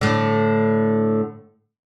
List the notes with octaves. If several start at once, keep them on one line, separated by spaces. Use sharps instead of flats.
A2 D3